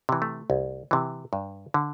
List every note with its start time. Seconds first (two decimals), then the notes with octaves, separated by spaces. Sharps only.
0.09 C3 E3
0.22 A3
0.50 C2
0.91 C3 E3
1.33 G2
1.74 D3